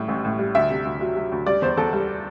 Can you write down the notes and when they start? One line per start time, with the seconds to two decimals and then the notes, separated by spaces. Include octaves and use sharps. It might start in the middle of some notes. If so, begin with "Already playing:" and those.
Already playing: A2 G3
0.08 A1
0.25 A2
0.39 G3
0.55 D2 E5
0.70 C3
0.85 D2
1.01 F#3
1.16 F#3
1.32 D2
1.46 G3 D5
1.62 E2 C5
1.77 E2 A4
1.93 G3